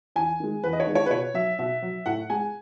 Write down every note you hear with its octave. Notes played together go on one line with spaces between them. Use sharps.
E2 G#5
D#3 G#3
E2 B4
D#5
C#5
D#3 G#3
C#5
B4
B2 C#5
F#3 E5
B2 E5
F#3
A2 F#5
G#3 G#5